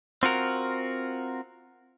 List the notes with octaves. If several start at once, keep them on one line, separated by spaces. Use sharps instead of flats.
C4 F4 F#4 A#4